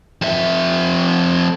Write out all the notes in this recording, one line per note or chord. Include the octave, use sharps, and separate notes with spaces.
F2 E5